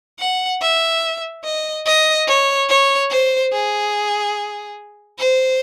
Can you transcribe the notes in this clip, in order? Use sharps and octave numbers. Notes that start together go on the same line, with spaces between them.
F#5
E5
D#5
D#5
C#5
C#5
C5
G#4
C5